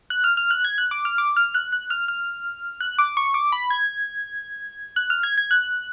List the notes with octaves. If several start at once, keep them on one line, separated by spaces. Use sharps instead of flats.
F#6
F6
F6
F#6
G#6
F#6
D6
F6
D6
F6
F#6
F#6
F6
F6
F#6
D6
C#6
D6
B5
G#6
F#6
F6
G#6
G#6
F#6